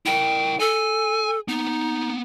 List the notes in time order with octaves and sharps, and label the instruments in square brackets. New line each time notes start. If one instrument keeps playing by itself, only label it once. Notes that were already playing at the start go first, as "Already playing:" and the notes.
[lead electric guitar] E4 A#4 [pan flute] G5
[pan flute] A4 [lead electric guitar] G#5
[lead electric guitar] A#3 B3 [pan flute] D#4